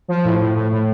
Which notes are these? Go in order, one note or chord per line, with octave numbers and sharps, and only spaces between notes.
F3
A2
A2
A2
A2